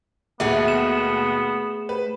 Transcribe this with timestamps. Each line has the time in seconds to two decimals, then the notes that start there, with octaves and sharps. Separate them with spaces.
0.40 D#2 B2 A3 B3 G#4 E5 F#5
0.68 E7
1.89 B4